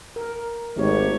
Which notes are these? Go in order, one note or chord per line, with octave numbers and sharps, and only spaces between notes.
A#4
G#1 A3 G4 C#5